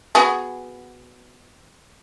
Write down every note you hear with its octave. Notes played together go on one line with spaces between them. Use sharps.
B3 F#4 G#4